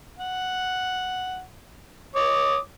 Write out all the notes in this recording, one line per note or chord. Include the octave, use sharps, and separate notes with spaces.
F#5
C#5 D6 D#6